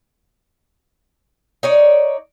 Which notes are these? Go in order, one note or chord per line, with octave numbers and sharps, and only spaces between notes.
D#4 C#5 D5